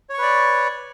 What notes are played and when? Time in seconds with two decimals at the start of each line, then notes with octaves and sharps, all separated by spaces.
0.10 C#5
0.14 C#6
0.18 B4
0.22 D5